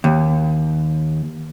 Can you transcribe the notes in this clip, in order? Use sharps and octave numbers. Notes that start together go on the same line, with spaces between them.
D#2